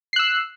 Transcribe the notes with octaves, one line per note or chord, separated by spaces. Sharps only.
E6 F#6 C7